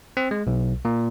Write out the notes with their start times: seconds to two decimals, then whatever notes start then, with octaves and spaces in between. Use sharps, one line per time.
0.17 C4
0.31 G#3
0.47 B1
0.85 A#2